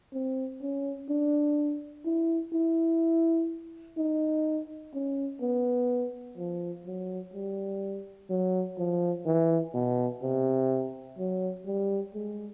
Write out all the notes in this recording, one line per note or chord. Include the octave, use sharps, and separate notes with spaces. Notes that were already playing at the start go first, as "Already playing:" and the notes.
C4
C#4
D4
E4
E4
D#4
C#4
B3
F3
F#3
G3
F#3
F3
E3
B2
C3
F#3
G3
G#3